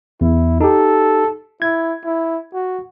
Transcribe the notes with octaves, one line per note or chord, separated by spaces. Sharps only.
E2 E4
D#4 G4 A4
E4 G#6
E4
F#4